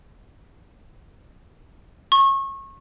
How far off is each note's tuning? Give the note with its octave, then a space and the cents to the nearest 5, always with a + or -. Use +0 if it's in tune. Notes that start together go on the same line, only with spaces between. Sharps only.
C#6 -30